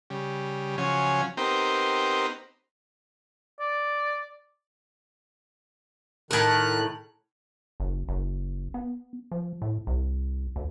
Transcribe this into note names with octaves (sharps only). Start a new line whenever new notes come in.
C#3 G3
C#3 F3 F#3 C#4 G#5
B3 C4 D#4 G4 A#4 C5
D5
A2 D#3 A#4 F#6
F#1
F#1
B3
F3
A2
C2
D2